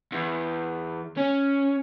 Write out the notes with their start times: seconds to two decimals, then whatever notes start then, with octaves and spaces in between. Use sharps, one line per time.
0.12 E2
1.18 C#4